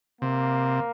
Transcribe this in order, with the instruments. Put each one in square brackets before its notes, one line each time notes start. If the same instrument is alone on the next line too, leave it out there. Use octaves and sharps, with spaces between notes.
[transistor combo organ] C3 [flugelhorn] A#3